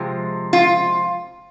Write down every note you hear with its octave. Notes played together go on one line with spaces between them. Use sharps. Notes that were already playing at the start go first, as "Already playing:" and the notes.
Already playing: C3 F3 G#3
F4